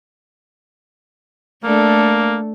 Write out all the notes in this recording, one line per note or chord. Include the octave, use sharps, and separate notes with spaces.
A3 A#3 D4 A4